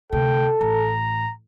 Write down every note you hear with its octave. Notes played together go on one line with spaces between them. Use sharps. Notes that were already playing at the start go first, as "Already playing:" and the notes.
D2 C3 A4 G5
A1 A#5